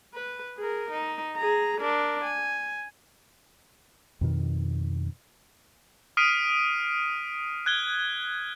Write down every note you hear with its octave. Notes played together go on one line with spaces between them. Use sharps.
B4
G#4 A#4
D#4
G#4 A#5
D4 A#4
G#5
F2 B2 D#3
D#6 F6 B6 C7 D7 D#7
F#6 G#6 G7